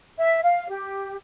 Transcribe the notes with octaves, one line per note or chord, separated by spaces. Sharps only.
E5
F5
G4